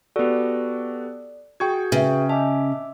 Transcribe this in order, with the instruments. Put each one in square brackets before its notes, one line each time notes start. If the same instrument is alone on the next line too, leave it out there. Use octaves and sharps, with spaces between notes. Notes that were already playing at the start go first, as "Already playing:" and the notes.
[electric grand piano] B3 F#4 [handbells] G4 A4 [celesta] D5
[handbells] F#4 G#4 [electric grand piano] G5 C#6 G#6
[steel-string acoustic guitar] C#3 [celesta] B4 E5
[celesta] D#5 G#5 A5 [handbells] E5 D6